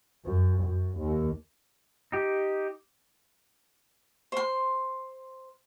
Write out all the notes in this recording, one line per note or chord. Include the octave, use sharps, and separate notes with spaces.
F#2
F#2
D#2
D#4 G4
C5 C6